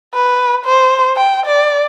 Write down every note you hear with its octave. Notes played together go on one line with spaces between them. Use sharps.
B4
C5
G5
D5